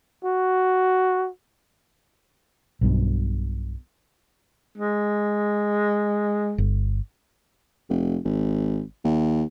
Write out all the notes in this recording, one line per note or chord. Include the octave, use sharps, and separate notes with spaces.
F#4
B1 G2 B2
G#3
G1
F1
G#1
D#2